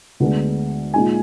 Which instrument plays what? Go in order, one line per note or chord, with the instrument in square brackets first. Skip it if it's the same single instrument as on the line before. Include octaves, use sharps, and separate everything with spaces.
[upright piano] D2 D3 G#3 B3 D4
A#2 G#3 D#4 G#5